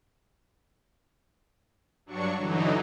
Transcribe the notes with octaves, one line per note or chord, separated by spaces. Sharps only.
G2 F#3 D4 C#6 C#7
D3 E3 F#3 D#4